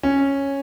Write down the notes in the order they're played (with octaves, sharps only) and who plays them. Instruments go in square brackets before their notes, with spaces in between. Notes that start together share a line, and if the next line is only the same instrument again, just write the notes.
[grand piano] C#4